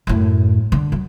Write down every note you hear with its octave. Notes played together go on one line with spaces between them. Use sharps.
F#2 A2
D3
F#3